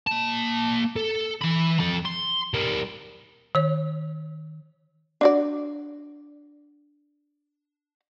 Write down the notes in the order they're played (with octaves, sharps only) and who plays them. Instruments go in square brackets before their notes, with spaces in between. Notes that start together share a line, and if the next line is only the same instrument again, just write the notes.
[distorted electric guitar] A#3 A5
A4
E3 B5
F2 A4
C6
G3 A#4
[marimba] D#3 C#5
[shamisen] D4 F#4 D5